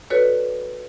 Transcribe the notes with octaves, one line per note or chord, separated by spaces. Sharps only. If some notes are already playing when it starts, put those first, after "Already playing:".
F#4 A4 B4 C#5 D5